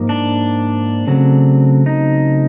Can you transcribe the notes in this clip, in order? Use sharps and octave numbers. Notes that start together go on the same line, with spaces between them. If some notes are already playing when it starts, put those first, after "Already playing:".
Already playing: G#2 F3 A#3
D4
C#3 F#3 A3 C4
D#4